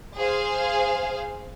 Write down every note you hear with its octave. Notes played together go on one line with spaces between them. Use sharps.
G#4 C5 F5